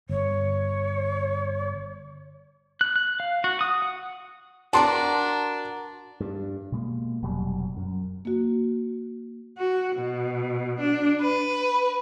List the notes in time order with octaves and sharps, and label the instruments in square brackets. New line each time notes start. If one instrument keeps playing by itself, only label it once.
[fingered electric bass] G1 [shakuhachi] C#5
[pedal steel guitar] F#6
F#6
F5
F#4
D#6
F#5
[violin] D4 [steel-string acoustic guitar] F#4 A#4 D5 [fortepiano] A5 C6
[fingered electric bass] G2
B2 G#3 A#3
F1 B2 F#3 G3
F#2
[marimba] A#3 F#4
[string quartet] F#4
B2
D4
B4